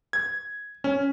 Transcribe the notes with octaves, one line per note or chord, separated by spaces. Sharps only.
G#6
C#4